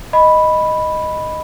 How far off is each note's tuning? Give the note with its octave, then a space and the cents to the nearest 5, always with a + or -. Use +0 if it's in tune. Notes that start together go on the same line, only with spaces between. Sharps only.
D#5 +0 B5 +0